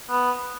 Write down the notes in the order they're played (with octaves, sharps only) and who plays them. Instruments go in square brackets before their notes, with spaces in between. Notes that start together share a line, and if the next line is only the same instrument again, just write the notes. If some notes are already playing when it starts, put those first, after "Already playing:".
[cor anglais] B3